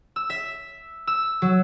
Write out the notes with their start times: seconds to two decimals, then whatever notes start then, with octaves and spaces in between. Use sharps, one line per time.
0.16 E6
0.30 E5
1.07 E6
1.42 F#3